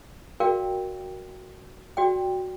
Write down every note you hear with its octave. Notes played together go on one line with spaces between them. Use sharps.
F#4 A#4 D5 F5 G5
F#4 D5 G5